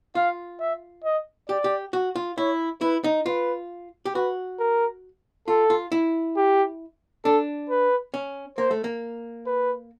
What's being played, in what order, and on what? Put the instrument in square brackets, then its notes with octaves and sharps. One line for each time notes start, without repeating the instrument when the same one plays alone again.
[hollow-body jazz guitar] F4 [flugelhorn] F5
[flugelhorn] E5
D#5
[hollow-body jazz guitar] G4 [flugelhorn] D5
[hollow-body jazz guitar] G4
F#4
F4
[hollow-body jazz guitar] E4 [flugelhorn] C#5
[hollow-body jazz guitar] E4 [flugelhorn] B4
[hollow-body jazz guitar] D#4
[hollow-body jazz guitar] F4 [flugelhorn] B4
[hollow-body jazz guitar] G4
[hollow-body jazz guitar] F#4 [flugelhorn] B4
[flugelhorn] A#4
[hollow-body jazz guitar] F4 [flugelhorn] A4
[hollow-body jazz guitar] F4
E4
[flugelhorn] G4
[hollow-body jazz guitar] D4 [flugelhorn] A4
[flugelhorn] B4
[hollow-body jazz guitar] C#4
[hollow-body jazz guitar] A#3 [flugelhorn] C5
[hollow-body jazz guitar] A3
A#3
[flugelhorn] B4